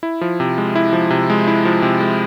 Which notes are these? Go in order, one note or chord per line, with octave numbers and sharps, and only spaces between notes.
E4
F3
C3
G#3
E4
F3
C3
G#3
E4
F3
C3
G#3